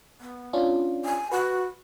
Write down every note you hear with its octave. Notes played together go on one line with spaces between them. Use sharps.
B3
C#4 D4 F4
G#5
F#4 B4